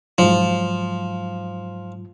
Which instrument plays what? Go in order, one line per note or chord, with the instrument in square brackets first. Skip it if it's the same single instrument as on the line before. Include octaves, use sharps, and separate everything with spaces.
[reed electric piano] G#2 F#3 [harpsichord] F3